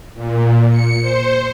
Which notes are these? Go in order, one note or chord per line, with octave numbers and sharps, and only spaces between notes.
A#2
C#7
C5